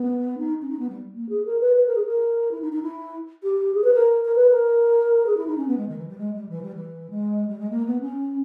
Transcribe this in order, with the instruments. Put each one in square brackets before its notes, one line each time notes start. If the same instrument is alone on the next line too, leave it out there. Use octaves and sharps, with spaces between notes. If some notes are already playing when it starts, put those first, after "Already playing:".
Already playing: [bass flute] B3
D#4
C#4
D#4
B3
G3
A#3
G#4
A#4
B4
B4
A#4
G#4
A#4
E4
D#4
D#4
E4
G4
G#4
B4
A#4
A#4
B4
A#4
G#4
E4
D#4
C#4
B3
G#3
D#3
E3
G3
G#3
G3
E3
G3
E3
G#3
G3
G#3
A#3
B3
C#4